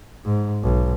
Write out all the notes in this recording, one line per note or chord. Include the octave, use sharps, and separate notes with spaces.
G#2
B1